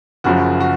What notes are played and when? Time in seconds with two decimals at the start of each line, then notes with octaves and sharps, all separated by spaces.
0.24 F#1 F#2 C#3 F3 F#4
0.60 F#4